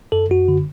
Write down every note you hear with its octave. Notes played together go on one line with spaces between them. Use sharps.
F#2 A4
F#2 F#4
D3